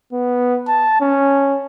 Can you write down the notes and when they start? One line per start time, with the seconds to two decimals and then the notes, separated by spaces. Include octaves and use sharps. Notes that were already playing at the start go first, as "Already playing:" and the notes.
0.13 B3
0.67 A5
1.01 C#4